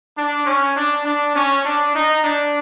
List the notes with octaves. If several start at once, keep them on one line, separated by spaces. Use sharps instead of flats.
D4
C#4
D4
D4
C#4
D4
D#4
D4